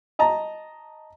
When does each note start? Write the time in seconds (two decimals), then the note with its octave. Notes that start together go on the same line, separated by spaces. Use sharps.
0.19 D#5 A5 A#5